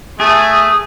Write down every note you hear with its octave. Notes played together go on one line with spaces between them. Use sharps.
A3 G#4